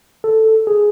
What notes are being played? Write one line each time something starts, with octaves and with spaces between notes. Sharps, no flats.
A4
G#4